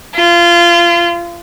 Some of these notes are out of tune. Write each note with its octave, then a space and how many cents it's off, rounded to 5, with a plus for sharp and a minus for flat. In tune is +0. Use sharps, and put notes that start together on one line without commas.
F4 -25